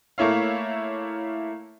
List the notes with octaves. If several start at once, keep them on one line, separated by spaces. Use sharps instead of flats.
A3 A#3 E4 C#5 F5